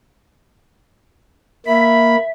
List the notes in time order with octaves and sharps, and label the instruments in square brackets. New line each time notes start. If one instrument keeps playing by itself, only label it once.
[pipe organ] A#3 B5 [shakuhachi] E5